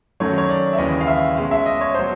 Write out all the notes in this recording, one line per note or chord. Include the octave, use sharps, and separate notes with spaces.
F#2 D#3 F#3 A3 C#4 C#5
C#5
D5
E5
D#2 C#3 E3 G#3 C#4 D#5
F5
E5
B2 G#3 C#4 F5
E5
D#5
C#5
B2 F#3 C5